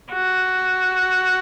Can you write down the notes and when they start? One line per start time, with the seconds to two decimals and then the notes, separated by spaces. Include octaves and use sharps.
0.12 F#4